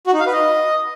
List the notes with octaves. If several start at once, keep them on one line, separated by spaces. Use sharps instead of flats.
F#4
D#4
F5
B4
D#5